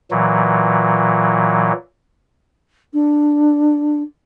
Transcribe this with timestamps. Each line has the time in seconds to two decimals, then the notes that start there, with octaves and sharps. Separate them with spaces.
0.11 A#2 E3 F#3
2.93 D4